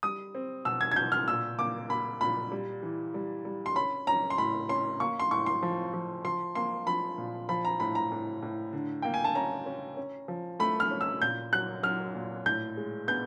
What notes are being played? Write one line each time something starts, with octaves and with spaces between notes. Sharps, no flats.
G3 D#6
C4
B2 E6
G#6
G#6
B2 G6
F6
A#2 E6
A#3 D6
A#3 B5
A#2 B5
G3
E3
G3
G3
C6
C#4 B5
C#4 A#5
C6
A2 B5
C#4 C6
A#3 C#6
C6
A2 C#6
C6
F3
F3
F3 C6
A#3 C6
F3 B5
A#2
F3 B5
A#5
A2 B5
A#5
A2
A2
D3
A#3 G5
G#5
A5
C#4 A#5
C#4
C#4
F3
A3 B5
F6
C#4
E6
A#2 G6
F#3 F#6
F#3 F6
A#2
A2 G6
G#3
B3 G6